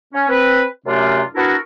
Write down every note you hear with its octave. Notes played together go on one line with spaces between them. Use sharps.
C#4
C4 B4
F#2 C3 A3 C#4 D4 F4
B3 D4 E4 F#4 A4 A#4